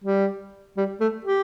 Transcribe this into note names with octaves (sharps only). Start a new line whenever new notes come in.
G3
G3
A3
G4